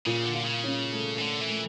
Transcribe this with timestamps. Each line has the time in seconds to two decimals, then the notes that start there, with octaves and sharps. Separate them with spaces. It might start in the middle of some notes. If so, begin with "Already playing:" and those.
0.06 A#2 C#3
0.25 D3
0.34 F4
0.45 C#3
0.64 C#4
0.93 A3
1.18 E3
1.21 D3 A3
1.41 E3
1.50 A3